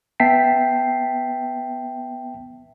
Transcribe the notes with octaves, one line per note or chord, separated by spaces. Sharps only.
B3 E5 G5 A5 B6 C7